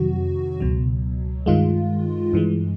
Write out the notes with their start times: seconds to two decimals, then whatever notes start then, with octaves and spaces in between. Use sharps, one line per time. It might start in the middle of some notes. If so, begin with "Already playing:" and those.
Already playing: F2 C3 D#3 F#3 F#4
0.60 C#2 B2 F#3
1.46 G2 D#3 G#3 F4
2.33 G2 E3 G#3